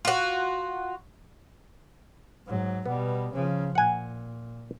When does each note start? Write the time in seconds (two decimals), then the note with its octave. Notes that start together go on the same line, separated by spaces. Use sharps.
0.05 F4 F#4
2.46 G#2 F#3
2.86 B2 G3 B3
3.33 C#3 F3
3.75 A#2 F#5 G#5